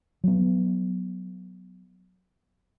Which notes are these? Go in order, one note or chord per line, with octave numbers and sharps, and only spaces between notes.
F#3 B3